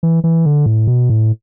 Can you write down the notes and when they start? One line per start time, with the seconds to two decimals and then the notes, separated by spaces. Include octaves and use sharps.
0.03 E3
0.24 E3
0.45 D3
0.66 A2
0.87 B2
1.10 A2